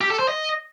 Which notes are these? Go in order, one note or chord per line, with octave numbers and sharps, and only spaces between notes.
G4
A4
C5
D#5